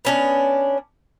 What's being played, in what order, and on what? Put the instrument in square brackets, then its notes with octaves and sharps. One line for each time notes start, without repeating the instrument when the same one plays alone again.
[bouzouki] B3 C#4 D4